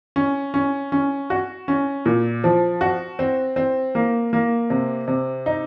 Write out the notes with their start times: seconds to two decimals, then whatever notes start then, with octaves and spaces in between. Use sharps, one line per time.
0.16 C#4
0.54 C#4
0.92 C#4
1.30 F#4
1.68 C#4
2.06 A#2
2.44 F3
2.81 F#4
3.19 C4
3.56 C4
3.95 A#3
4.33 A#3
4.70 C3
5.08 C3
5.46 D#4